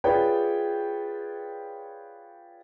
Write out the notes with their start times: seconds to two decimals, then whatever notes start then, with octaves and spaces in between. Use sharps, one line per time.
0.04 F4 G#4 B4 C#5 D5 G5